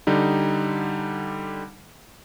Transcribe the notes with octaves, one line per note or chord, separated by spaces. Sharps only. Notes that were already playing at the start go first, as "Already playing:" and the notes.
D3 G3 D#4